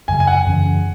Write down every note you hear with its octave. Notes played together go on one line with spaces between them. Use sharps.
F#2 C#3 F#3 G#5
G#5
F#5
F#2 C#3 E3 C#4